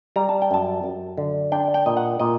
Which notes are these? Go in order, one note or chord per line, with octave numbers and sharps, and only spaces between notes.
G3 A#5
A5
G5
F#2 A5
F#2
D3
D4 G5
G5
A#2 D#5
F#5
A#2 D#5